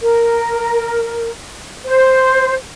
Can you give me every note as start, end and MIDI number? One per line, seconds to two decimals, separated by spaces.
0.01 1.31 70
1.85 2.55 72